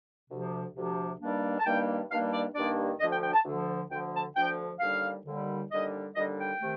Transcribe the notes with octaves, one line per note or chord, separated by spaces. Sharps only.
D2 C3 F3
D2 C3 F3
G2 D#3 G3 A#3 D4
A5
G2 D#3 G3 A#3 D4 G5
G2 D#3 G3 A#3 D4 F5
D5
G2 D#3 G3 A#3 D4 D5
D2 D3 F3 D#5
G5
G5
A5
D2 D3 F3
D2 D3 F3 G5
A5
D2 D3 F3 G5
D#2 D3 G3 F5
D#2 D3 G3
D#2 D3 G3 D#5
D#2 D3 G3 D#5
G5
C3 D#3 A3